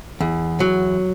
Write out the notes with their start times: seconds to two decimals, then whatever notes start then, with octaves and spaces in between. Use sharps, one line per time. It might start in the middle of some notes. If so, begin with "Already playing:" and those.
0.21 E2
0.60 F#3